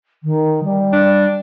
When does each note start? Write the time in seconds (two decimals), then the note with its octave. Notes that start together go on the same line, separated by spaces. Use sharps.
0.23 D#3
0.64 G3
0.93 D4